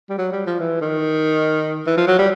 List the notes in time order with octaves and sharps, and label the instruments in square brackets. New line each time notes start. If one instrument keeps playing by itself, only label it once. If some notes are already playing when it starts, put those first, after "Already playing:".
[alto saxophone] G3
F#3
G3
F3
E3
D#3
E3
F3
F#3
G3